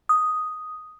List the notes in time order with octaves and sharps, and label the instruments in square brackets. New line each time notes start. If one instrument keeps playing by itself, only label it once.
[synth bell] D#6